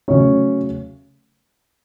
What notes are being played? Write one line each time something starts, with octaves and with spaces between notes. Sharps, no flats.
C#3 F#3 A3 C#4 C#5